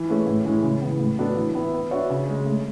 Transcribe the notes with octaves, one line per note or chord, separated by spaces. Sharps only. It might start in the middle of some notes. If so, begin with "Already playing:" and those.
Already playing: E3
A3 C#4 G#4 B4
A2
E3 G#3 C#4
C#3
E3 B3
A2
F#3 B3 D4 A4
E3
B3 E4
B3
D4 F#4 C#5 E5
C#3
G#3 C#4
A3